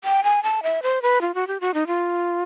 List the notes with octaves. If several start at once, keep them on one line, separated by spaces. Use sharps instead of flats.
G5
G#5
A5
E5
C5
B4
F4
F#4
G4
F#4
D#4
F4